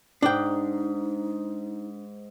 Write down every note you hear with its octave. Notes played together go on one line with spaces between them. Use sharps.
G#2 D4 D#4 G5